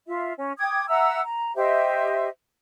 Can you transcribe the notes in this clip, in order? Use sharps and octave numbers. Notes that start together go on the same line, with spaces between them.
F4 E5
C#4
G5 D6 D#6 G#6
E5 F#5 A#5 E6
A#5
G4 C5 D#5 E5